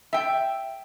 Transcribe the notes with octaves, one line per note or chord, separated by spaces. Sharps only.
E5 G5